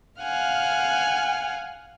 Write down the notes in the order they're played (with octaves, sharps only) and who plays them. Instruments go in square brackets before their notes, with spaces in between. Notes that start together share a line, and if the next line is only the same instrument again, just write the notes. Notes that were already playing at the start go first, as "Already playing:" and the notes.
[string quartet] F5 F#5 G#5 F6